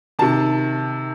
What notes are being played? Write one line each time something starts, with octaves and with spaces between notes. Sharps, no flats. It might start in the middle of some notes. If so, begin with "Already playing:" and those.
C3 D#3 A5